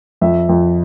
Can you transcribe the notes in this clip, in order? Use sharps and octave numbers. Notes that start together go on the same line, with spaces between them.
F2 E5
F2